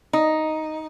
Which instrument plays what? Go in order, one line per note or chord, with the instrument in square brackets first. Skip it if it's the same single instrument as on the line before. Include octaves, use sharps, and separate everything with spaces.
[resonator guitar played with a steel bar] D#4